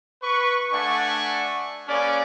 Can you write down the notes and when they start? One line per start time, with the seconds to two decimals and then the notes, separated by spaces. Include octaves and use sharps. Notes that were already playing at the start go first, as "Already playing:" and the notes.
0.23 B4 C#6
0.72 A3 D4 D5 F#5 G#5 C#6
1.88 A#3 C#4 G#4 B4 D5